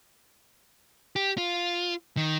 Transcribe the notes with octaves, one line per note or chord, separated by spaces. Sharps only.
G4
F4
D#3